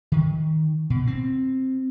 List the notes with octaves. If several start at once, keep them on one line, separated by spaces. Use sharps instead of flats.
D#3
B2
C4